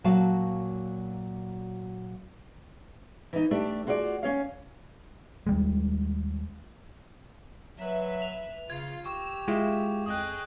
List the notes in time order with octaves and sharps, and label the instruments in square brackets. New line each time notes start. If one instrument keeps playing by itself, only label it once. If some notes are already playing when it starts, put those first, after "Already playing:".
[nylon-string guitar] A#2 F#3 F#4 F5 A5
[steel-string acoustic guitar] E3 D#4
A3 D4 G4
F4 F#4 G#4 C5 D5
C#4 C#5 F5
[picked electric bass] D#2 G3 G#3
[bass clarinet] F#3 [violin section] B4 E5
[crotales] F7
[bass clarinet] C#3 [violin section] F4 [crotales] G#6
[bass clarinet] G4 [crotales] C#6 [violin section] E6
[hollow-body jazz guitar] G#3 E4 F4
[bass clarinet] F2 [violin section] G#4 D#5 G5 [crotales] D#6 F#6